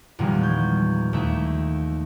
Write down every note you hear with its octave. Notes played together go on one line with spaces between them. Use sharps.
E2 A#2 D#3 F3 G3 G#3
C#6 G6 G#6
D#2 A3 E5